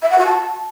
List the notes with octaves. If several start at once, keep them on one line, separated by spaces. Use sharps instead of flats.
E5
F#5
F#4
A5